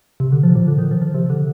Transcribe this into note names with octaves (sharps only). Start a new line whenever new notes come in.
C3
D3
F3
A#2
D3
D#3
F3
F3
C3
D3